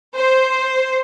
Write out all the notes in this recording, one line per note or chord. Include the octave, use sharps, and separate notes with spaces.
C5